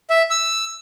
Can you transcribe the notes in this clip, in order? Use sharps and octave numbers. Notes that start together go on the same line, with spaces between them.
E5
E6